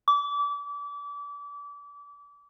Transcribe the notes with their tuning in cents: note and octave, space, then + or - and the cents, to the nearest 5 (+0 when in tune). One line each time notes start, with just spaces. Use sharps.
D6 -30